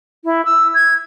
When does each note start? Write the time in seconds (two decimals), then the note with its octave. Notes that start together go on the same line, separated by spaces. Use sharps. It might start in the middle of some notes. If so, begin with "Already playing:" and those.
0.24 E4
0.45 E6
0.74 G#6